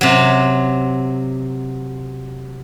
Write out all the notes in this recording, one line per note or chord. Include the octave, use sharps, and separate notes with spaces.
C3 F#3